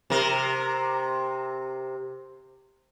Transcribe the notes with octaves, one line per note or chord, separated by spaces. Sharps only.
C3 A#4